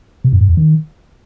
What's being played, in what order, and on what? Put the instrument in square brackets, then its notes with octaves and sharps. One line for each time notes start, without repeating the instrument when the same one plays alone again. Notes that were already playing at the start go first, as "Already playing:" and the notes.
[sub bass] C3
F#2
G2
E2
D#3